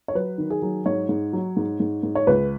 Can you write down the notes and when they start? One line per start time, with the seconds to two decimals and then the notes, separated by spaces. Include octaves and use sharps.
0.08 C#5
0.15 F#3 B4
0.38 D#3
0.50 G#4
0.62 F#3
0.86 G#2 C#5
1.09 G#2
1.33 F#3
1.57 G#2
1.80 G#2
2.03 G#2
2.15 C#5
2.27 C#2 B4